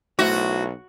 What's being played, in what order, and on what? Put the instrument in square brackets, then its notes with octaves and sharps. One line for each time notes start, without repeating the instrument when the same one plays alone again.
[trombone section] B1 [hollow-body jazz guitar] A3 E4 C5 [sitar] F#4